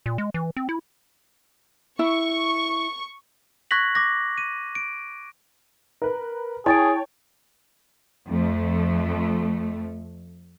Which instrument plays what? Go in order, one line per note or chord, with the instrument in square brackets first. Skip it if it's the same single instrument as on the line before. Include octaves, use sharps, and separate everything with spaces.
[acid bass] A#2
G#3
E3
C4
E4
[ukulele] E4 [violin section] C#6
[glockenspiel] C#6 F#6 G#6 A#6 B6 F#7
D6 A#6
D#7
D7
[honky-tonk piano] A#4 B4
[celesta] E4 A6 D7 [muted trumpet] G#4 [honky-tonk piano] C#5 G5 A5
[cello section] F2 A3